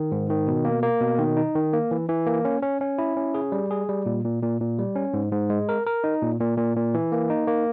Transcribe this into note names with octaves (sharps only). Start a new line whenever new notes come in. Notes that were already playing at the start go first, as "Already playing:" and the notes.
Already playing: D#3
G#2
D#3
B2
A#3
A#3
B2
D#3
D#4
D#3
A#3
E3
E3
A#3
C#4
C#4
C#4
E4
C#4
G#4
G3
G#4
G3
A#2
A#2
A#2
A#2
G3
C#4
G#2
G#2
G#3
A#4
A#4
D#4
A#2
A#2
A#2
A#2
E3
A#3
D#4
A#3